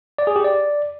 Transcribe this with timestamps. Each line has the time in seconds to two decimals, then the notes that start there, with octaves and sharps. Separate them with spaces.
0.18 D5
0.27 G#4
0.36 G4
0.44 D5